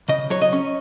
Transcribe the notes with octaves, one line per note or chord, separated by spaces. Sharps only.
C#3 D#5
F#3 C#5
D#5
C#4